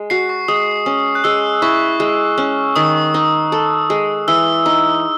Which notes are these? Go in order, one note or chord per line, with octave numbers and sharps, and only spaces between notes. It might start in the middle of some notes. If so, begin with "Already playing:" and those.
Already playing: G#3
F#4 C7
C#6
G#3 D#6
C#4
F#6
G#3 E6
E4 C#6
G#3
C#4
D#3 D#6
D#4
A4
G#3
E3 E6
D#4